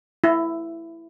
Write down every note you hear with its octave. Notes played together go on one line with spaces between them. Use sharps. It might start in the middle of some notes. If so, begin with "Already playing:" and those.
E4